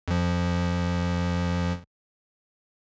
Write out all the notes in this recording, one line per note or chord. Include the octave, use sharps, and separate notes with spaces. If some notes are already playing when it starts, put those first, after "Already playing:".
F2 F3